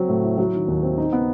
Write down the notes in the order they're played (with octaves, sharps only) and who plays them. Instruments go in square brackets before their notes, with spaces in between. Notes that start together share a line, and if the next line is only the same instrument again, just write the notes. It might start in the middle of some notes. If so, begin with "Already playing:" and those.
Already playing: [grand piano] F#3 C4
A2
E4
F#3
D#3
D#2
C4
D#4
B3